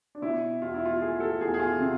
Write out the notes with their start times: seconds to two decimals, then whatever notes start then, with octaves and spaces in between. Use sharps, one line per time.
0.15 D4
0.22 B2 E4
0.62 E2 F4
0.74 E4
0.86 F4
1.01 A3 G#4
1.20 A4
1.41 E2 G#4
1.54 G#4
1.59 F4
1.80 C3